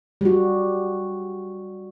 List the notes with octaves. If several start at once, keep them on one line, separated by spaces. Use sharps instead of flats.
G3 F#4